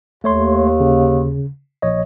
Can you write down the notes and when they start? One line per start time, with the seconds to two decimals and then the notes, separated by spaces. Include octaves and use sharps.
0.24 D#2 A3 C#5 C6
0.80 C#3
1.82 A#1 C#5 D#5